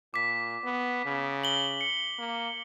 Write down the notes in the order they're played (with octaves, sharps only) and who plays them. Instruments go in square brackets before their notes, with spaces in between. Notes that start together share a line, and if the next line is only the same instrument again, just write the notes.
[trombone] A#2 [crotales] D6 B6
[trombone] B3
C#3
[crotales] F#7 G7
C#7
[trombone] A#3